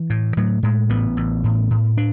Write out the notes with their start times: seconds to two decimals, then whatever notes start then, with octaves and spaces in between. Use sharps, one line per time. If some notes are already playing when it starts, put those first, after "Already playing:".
Already playing: E3
0.10 A2
0.37 A2 F#3
0.63 A2 G#3
0.90 A1 B3
1.17 A1
1.44 A2
1.70 A2
1.98 D4